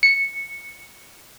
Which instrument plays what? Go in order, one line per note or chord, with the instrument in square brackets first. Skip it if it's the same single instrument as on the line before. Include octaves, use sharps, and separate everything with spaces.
[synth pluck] C#7